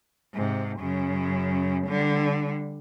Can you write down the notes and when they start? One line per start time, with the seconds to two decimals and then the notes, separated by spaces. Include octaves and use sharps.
0.34 G#2 C3
0.80 F#2 C#3
1.87 D3 G3